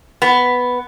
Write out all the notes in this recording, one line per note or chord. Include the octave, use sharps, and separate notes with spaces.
B3